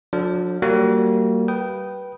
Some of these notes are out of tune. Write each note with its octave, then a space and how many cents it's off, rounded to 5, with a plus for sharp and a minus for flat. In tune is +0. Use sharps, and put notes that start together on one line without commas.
F#3 -45 D4 +0 A4 +0
G3 -35 A#3 -25 F#4 -25
B4 -10 G5 -20 D#6 -5